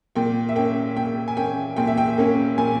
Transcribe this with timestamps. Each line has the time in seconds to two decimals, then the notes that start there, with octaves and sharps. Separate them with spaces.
0.15 A#2 G5
0.49 E5
0.56 A#3 C#4 G5
0.96 A#2 G5
1.28 G#5
1.37 A#3 C#4 G5
1.76 A#2 G5
1.87 E5
1.98 G5
2.18 A#3 C#4
2.58 A#2 G#5